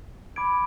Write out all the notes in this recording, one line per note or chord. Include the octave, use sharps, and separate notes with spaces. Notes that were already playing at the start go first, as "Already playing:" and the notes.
B5 D6 G#6 D7